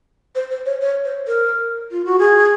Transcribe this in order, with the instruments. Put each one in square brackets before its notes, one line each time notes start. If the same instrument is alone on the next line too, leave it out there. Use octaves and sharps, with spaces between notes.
[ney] C5
C5
C#5
C#5
C5
A#4
F4
F#4
G#4